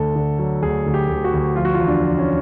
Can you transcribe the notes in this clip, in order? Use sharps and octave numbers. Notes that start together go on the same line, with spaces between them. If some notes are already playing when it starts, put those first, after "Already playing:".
Already playing: D2 D3 A4
D3
F#3
D2 G#4
D2
G4
D2
F#4
D2
F3 F4
F#4
F4
E2
D4
F3
C#4